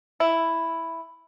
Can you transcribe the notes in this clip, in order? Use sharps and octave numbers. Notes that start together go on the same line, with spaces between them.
E4